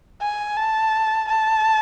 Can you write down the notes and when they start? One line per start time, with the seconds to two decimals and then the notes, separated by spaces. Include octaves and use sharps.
0.21 G#5
0.56 A5
1.29 A5